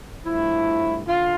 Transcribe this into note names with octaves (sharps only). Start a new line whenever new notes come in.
G2 F3 A3 E4
D3 F4